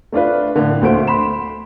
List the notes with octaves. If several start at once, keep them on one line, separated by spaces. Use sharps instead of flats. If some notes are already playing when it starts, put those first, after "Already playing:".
A3 D4 F4 B4
A2 D3
D2 A#2 A3 C5 F#5 D7
B5 C6 E7